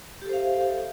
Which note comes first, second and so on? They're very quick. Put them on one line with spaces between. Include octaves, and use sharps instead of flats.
G4 A4 C5 F5 E5